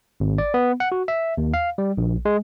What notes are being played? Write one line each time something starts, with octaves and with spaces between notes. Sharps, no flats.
G#1
D5
B3
F#5
F#4
E5
D#2
F5
G3
A#1
G#3